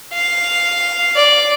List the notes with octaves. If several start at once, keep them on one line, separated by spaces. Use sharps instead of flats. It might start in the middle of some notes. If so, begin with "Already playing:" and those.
F5
D5